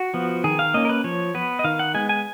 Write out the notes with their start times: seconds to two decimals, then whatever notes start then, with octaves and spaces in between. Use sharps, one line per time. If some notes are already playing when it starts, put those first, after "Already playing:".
Already playing: F#4
0.14 F3 B3
0.44 D#3 G#4
0.59 F5
0.74 A#3 C#4 D#5
0.85 A#4
0.89 B4
1.04 F3 C#5
1.34 B3 B4
1.59 D#5
1.64 D#3 F5
1.79 F#5
1.94 G#3 B3 G#5
2.09 G#5